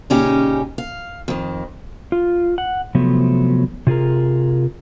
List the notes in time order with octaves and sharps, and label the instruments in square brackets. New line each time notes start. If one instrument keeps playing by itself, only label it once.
[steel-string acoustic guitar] A#2 C#3 C#4 D#4 G4
F5
F2 D#3
[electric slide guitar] F4
F#5
C3 F3 F#3 A3 B3
C3 F4 G#4 A#4